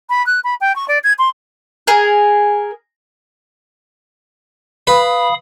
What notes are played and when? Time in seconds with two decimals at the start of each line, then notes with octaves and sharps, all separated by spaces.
0.10 B5
0.27 F#6
0.44 B5
0.61 G5
0.76 C#6
0.88 D5
1.04 G#6
1.19 C6
1.87 G#4 A#4
4.87 B4 F5 B5 D#6